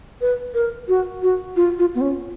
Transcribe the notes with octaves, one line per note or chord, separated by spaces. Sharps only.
B4
A#4
F#4
F#4
F4
F4
B3
C#4